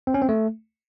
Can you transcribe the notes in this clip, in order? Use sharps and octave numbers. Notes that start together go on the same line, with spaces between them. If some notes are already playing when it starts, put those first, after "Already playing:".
C4
C#4
C4
A3